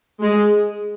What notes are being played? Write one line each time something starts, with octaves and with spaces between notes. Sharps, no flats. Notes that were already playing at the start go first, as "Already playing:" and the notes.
G#3